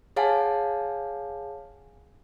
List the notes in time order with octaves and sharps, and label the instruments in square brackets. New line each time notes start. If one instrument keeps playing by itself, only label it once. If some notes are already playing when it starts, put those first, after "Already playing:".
[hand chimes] G#4 C#5 F5 F#5 G#5 A5